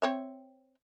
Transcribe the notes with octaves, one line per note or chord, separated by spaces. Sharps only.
C4 C#5 E5